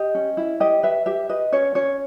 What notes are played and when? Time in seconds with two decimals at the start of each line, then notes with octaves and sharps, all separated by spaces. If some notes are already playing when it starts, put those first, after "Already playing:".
Already playing: G4 D#5
0.15 C#4
0.37 E4
0.60 G4 D#5
0.83 B4 E5
1.06 G4 E5
1.29 B4 D#5
1.53 C#4 C#5
1.75 C#4 C#5